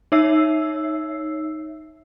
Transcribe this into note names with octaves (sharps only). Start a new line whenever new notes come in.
D#4 C#5 E5 E6 C7